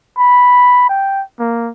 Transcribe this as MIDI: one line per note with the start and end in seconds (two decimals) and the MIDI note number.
0.18 0.87 83
0.89 1.22 79
1.39 1.71 58